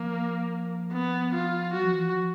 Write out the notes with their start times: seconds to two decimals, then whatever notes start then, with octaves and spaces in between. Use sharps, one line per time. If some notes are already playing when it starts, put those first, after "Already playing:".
Already playing: F3 A#3
0.93 B3
1.34 F4
1.74 F#3 F#4
1.84 F3
1.94 E3
2.05 F3